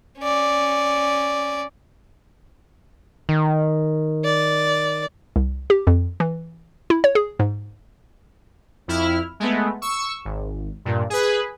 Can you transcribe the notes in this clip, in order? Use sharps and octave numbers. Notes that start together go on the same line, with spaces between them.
C#4 D5
D#3
D5
C2
G4
F2
E3
E4
C#5
G#4
G#2
F2 E4 F6
G#3 A3 B3
C#6 E6
G#1
G2 A#2
G#4 B4